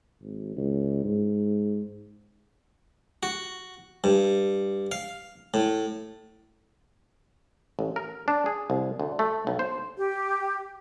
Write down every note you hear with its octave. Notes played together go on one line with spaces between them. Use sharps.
G#1
C#2
G#2
F#4
G2
F5
A2
A1
A#4
D4
G#4
C2
D2
A3
B1
C5
G4